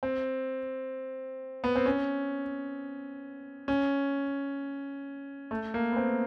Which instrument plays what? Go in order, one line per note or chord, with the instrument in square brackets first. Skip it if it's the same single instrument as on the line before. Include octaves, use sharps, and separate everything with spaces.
[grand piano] C4
B3
C4
C#4
C#4
A3
A#3
B3
C4